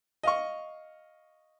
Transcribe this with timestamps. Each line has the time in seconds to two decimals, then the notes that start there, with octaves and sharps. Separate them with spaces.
0.23 D#5 F5 C#6